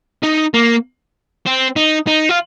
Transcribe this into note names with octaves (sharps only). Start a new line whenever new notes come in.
D#4
A#3
C4
D#4
D#4
F4